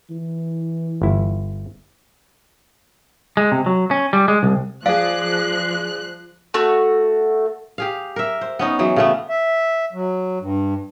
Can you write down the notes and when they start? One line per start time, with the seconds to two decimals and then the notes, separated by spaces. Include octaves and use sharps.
0.11 E3
1.02 G1 E4
3.37 G#3
3.52 C3
3.66 F#3
3.91 C#4
4.13 G3
4.28 G#3
4.43 C2
4.86 F3 G#4 D5 F5 F#6
6.54 A3 F#4
7.78 G4 G#4 F5
8.16 A#4 E5
8.41 C5
8.59 B3 C#4 D#4
8.79 E3 F#3 G#4
8.96 C#3 A3 B3
9.29 E5
9.93 F#3
10.41 G2